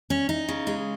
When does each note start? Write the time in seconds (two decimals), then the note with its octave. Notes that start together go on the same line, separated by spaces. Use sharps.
0.10 C#4
0.29 D#4
0.49 C#3
0.67 G#3